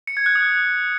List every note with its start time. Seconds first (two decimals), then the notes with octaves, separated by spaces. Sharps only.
0.07 C#7
0.17 G#6
0.26 F#6
0.35 D#6